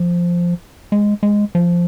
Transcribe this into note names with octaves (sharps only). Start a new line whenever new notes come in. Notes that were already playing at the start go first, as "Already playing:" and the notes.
Already playing: F3
G#3
G#3
F3